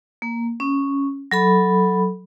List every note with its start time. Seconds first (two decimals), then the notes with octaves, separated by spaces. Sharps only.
0.22 A#3
0.60 C#4
1.31 F#3 A4 B5